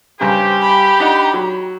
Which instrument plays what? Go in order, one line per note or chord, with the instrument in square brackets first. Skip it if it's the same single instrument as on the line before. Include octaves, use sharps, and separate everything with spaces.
[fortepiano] G2 C#3 A#5 [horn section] G4 [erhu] C5
[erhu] B5
[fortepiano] D4 D#4 F#5
F#3